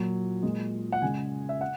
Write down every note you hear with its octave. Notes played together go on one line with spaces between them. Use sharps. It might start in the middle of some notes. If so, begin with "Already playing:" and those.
Already playing: A#2 F#3
A#2 G#3
F#5
C#3 G#3 G#5
E5
F#5